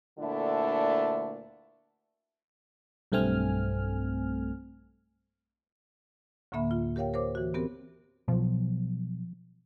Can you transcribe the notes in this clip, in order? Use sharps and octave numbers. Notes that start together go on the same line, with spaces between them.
D2 A#2 D3 A3 D4 E4
B1 G2 A3 C4 G#5 F6
D2 A2 D3 A#3 E5 B5
F4
G4 A#4 C#5 F5 G5
A#4 C5 C#5 D6
E3 F#4
B3 C4 G4 A#4
B2 F3 F#3